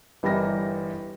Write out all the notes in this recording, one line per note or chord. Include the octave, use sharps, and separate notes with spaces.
G1 E3 G3 A#4 D#5 A#6